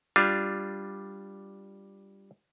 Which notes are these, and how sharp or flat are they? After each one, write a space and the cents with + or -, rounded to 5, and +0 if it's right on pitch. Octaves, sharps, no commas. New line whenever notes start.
G3 +0 D4 +0 F4 +0